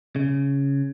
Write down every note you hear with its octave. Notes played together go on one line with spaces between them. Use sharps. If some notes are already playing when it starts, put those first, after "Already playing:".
C#3